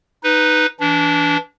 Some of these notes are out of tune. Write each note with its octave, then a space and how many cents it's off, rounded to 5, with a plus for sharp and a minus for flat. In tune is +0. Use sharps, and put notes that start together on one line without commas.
D#4 +0 B4 +0
E3 +0 D4 -20